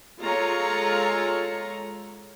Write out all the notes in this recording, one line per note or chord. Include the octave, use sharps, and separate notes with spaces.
G#3 F4 A4 C#5 A#5